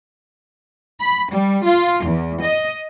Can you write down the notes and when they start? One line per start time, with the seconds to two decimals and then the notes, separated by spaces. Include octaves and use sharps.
1.01 B5
1.32 G3
1.67 F4
2.05 E2
2.42 D#5